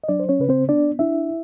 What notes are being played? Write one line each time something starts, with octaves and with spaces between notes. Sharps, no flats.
D#5
F#3 D4 D5
C5
C#4 C#5
C#3 B4
C4 C5
B3 D4 D5
D4 E4 E5